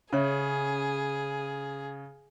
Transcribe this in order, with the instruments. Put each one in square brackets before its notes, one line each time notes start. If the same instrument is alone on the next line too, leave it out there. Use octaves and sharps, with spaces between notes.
[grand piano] C#3 [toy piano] C#4 C#5 E5 [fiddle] G#4